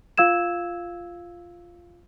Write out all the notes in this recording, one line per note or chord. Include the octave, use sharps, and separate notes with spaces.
F4 F5 E6 G#6 E7